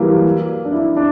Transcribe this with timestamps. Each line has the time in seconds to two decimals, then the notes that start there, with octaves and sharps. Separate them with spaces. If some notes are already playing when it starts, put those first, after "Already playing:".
Already playing: E3 F#3 G3 A#3
0.65 D4
0.72 E4
0.96 D4